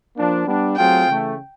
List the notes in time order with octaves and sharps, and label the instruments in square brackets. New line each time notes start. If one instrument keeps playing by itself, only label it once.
[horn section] F3 A#3 D4
G3 B3 D4
[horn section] F#3 A3 C4 F4 G#4 [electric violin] G5
[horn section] C#3 E3 A3